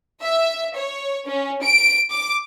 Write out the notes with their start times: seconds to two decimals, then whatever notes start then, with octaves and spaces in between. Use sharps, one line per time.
0.22 E5
0.75 C#5
1.28 C#4
1.62 D7
2.10 D6